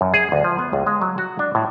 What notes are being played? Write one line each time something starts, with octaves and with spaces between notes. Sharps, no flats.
F#2
G#4
D2
F3
B3
C#2
G#3
F#3
F#4
D4
A2